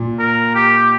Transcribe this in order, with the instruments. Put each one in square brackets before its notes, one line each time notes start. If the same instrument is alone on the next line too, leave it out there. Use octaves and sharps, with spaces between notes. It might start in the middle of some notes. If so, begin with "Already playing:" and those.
Already playing: [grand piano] A#2
[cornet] A#4
G4